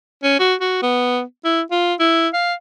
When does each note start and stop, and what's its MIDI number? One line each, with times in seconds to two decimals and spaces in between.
0.23 0.39 61
0.39 0.55 66
0.60 0.80 66
0.82 1.22 59
1.45 1.62 64
1.71 1.94 65
1.99 2.28 64
2.33 2.54 77